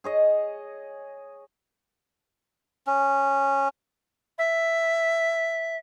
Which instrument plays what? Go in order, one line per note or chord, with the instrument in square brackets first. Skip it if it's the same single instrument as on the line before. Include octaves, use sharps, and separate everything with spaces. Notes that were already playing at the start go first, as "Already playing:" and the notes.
[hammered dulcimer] G#4 C#5 D#5
[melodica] C#4
[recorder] E5